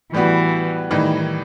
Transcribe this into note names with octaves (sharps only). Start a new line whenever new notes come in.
A2 E3 G3 B3 F#4
A2 D#3 E3 G3 D#4